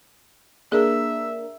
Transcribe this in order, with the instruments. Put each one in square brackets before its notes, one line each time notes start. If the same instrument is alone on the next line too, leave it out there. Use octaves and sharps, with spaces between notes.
[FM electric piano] A#3 D4 A#4 [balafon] G#4 [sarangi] E5